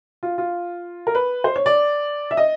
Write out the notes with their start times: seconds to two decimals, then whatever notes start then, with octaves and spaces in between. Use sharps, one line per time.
0.23 F4
0.38 F4
1.07 A#4
1.15 B4
1.44 C5
1.56 C#5
1.66 D5
2.31 E5
2.37 D#5